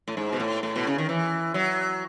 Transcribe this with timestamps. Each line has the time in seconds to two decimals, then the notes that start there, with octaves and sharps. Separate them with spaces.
0.08 A2
0.17 G#2
0.33 B2
0.40 A2
0.63 A2
0.76 B2
0.87 C#3
0.98 D#3
1.09 E3
1.54 F#3